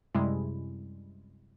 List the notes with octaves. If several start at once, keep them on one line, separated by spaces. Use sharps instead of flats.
F#2 C3 G3 G#3 E4